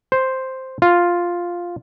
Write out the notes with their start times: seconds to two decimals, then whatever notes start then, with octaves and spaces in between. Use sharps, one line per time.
0.12 C5
0.82 F4